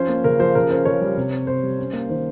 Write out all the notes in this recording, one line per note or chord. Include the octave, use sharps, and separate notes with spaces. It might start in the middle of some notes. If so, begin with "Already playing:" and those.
Already playing: F3 C#4 C5
A#3
C#3 A#4
F3 C5
C#3 A#4
C#4 C5
C#3 C#5
G3
C3
C4
C3 C5
G3
C#4
A#3
D#3 C5